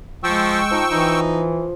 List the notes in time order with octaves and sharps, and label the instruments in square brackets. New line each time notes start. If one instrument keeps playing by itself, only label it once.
[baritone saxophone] F3 [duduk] G#3 [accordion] G5 C#6 E6
[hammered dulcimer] F3 [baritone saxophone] D#4
[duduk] E3 [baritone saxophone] D#4